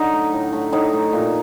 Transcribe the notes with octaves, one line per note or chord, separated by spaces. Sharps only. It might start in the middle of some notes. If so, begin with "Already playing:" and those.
Already playing: D3 F#3 D#4
A3
A2
A3
A2 D#4
A3
A#2